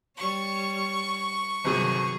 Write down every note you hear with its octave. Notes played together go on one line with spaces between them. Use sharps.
G3 C#5 C#6
G1 C3 D#3 F#3 G#4